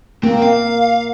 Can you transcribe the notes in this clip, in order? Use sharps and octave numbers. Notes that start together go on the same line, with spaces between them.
A#3 C4
F5